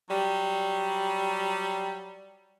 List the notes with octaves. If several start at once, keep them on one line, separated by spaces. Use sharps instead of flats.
F#3 G3